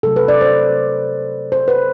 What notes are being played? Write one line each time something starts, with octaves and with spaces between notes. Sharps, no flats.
C3 F#3 A3 A4
B4
D5
C5
C5
B4